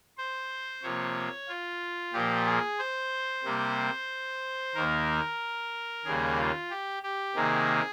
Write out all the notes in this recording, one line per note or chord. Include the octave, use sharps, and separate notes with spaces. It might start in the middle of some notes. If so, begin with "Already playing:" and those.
C5
C3 F3 A#3 C#5
F4
A#2 F3 A#3 G4
G#4
C5
C3 G3 A#3
D#2 D#3 A#3 A#4
D#2 C#3 G3 A#3 G#4
F4
G4
G4
C3 D#3 A#3 G#4